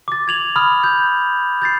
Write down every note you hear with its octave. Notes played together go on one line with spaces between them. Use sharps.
D6 A6
G#6 F7 F#7
B5 D#6 F6
G6
G6 A6 C7